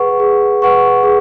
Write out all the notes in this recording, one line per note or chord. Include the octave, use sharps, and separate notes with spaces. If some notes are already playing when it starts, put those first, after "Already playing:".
Already playing: G#4 B4 F#5 C#6
G#4
B4 F#5 C#6
G#4